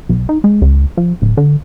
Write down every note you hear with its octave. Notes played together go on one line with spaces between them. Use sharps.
B1
D#4
G#3
C#2
F3
D1
D3